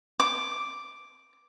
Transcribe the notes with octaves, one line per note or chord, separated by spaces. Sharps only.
D6